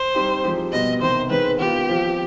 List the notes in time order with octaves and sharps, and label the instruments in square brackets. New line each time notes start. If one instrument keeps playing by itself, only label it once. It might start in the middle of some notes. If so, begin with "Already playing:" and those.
Already playing: [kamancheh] C5
[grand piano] G3 C4 D#4 G4
F3 G#3 C4 D#4 G4
[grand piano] B2 G3 B3 [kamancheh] D#5
[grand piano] C3 D#3 B3 D#4 [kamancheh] C5
[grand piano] D#3 G#3 C4 [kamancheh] B4
[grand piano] D#3 B3 F4 [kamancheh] G4
[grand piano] F3 C4 F4